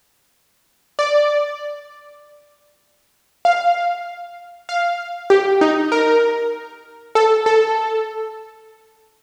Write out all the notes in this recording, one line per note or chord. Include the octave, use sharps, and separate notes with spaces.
D5
F5
F5
G4
D#4
A#4
A4
A4